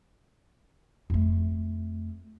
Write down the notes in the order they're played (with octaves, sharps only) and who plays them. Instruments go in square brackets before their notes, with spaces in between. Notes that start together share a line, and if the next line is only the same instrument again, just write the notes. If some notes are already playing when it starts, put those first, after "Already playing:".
[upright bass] F2 A3